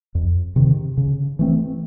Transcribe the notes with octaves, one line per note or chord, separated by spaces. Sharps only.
F2
C3 D#3
C#3
E3 A3 C4